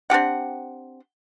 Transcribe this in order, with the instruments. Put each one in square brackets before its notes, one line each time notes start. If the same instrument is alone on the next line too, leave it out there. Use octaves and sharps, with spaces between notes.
[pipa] C4 D4 G4 F#5